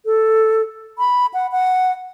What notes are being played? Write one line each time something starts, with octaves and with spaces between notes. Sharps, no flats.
A4
B5
F#5
F#5